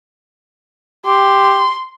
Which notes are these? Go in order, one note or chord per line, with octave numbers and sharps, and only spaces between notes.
G4 C6